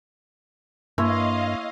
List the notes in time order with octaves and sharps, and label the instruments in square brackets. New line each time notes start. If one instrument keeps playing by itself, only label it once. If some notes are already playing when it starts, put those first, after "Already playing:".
[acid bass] G2 [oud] A#3 [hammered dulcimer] E4 C#5 C6 [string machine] D#5 F5